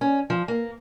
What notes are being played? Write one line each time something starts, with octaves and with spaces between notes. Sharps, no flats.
C#4
F3
A#3